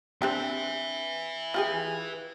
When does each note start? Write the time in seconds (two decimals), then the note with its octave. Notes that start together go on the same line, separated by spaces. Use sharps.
0.22 C4 D4 G4 B4 E5
1.54 F4 G4 G#4